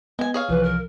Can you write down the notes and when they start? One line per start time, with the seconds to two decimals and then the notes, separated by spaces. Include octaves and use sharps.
0.19 G#3 B3 G#5
0.34 G#4 C#5 F5
0.49 C2 E3 F3 B4
0.63 A#4